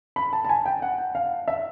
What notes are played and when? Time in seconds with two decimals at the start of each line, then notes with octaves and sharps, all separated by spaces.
0.16 B5
0.33 A5
0.45 A5
0.49 G#5
0.66 G5
0.82 F#5
1.15 F5
1.48 E5